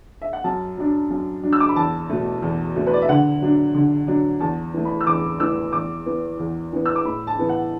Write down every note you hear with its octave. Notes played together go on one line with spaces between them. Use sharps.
E5
F#5
F#2 A5
F#3 D4
F#2
F#3 D4
E6
D6
B5
E2 A5
B2 A3
E2
B2 A3
B4
D5
E5
D3 F#5
F#3 D4
D3
F#3 D4
E2 A5
E3 A3
B5
E6
E2 D6
E3 A3 E6
E2 D6
E3 B3
E2
E3 B3
E6
D6
A2 B5
A5
E3 B3
F#5